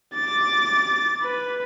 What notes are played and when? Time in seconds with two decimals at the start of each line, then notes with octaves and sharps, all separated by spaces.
0.15 D6 A6
1.23 B4